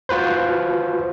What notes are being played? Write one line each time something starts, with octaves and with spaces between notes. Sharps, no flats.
F4 F#4 B4 C5